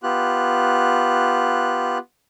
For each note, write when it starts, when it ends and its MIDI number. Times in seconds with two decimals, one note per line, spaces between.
0.03 1.98 59
0.03 1.98 65
0.03 1.98 67
0.03 1.98 90